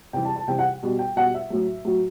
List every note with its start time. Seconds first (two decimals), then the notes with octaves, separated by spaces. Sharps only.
0.13 C3 E3 G3 G5
0.25 A5
0.36 A5
0.48 C3 E3 G3 G5
0.59 F#5
0.83 B2 G3
0.99 G5
1.16 B2 G3 F#5
1.34 E5
1.50 A2 F#3
1.85 A2 F#3